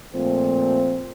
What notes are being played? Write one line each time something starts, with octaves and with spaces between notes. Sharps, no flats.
A#2 F3 A3 C4